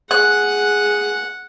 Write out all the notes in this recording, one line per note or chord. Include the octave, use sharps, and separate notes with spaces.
G#4 F#5 F#6